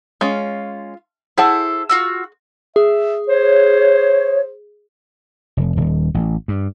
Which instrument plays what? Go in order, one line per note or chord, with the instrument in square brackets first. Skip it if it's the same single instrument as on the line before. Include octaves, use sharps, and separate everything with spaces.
[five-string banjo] G#3 C#4 [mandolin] F4
[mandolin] E4 A4 C5 [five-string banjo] G#4 F#5 A5
[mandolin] F4 F#4 E6
[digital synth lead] G#4 [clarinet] E5
[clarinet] C5 [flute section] C#5
[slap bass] F1
D#1
A1
G2